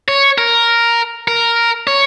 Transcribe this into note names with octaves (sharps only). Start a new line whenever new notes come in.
C#5
A#4
A#4
C#5